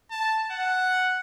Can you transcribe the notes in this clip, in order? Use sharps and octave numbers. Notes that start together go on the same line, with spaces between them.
A5
F#5